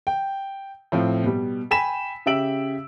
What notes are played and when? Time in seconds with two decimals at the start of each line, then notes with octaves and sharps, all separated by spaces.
0.07 G5
0.92 A2 F3 C4
1.24 B2 G3
1.71 G5 G#5 B5 B6 E7
2.26 C#3 G4 E5 E6 D7 F#7